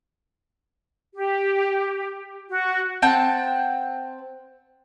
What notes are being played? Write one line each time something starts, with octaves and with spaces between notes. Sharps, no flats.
G4
F#4
C4 F#5 G5 A5